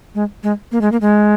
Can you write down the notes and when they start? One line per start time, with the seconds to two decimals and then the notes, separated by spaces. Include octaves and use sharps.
0.15 G#3
0.43 G#3
0.72 A#3
0.81 G#3
0.92 A#3
1.01 G#3